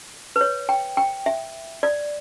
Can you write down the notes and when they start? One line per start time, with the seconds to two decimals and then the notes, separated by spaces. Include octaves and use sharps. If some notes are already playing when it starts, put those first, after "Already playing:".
0.36 B4
0.41 C#5
0.69 G5
0.97 G5
1.26 E5
1.83 D5